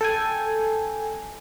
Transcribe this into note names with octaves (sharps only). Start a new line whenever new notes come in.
A4 G5 G#5